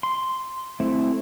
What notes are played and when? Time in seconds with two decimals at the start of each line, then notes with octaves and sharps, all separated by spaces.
0.03 C6
0.80 A3 C4 E4